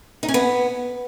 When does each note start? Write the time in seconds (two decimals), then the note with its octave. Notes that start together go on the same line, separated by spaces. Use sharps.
0.23 D#4
0.28 C#4
0.34 B3